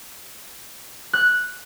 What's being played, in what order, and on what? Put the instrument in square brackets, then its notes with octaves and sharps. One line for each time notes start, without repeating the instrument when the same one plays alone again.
[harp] F#6